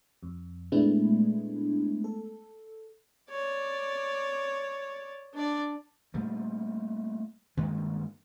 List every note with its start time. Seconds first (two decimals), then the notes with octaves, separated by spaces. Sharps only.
0.23 F2
0.72 A#2 G#3 A3 B3 D4 E4
2.04 A4
3.30 C#5 D5
5.34 D4 D5
6.14 A#2 G3 A3
7.57 G2 D#3 G#3 A#3